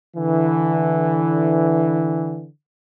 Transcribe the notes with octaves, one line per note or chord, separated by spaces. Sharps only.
D3 E3